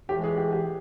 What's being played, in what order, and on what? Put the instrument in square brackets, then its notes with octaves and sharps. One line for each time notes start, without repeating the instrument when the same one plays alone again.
[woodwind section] A2 E3 G#3 [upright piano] G4
[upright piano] G#4
G4
G4